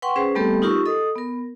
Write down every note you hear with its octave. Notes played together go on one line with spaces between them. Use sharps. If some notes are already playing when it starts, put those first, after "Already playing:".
B4 F#5 G5 C6 C#6
C#4 G#4 B4 C5
G3 A3 B3 C4 G4 A4
D#4 F4 G4 A#4 C#6 E6
A4 D#5 D#6
B3 A#4